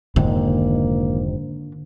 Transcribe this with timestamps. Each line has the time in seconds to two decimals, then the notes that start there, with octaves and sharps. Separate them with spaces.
0.16 F1 G#2 D3 D#3 A#3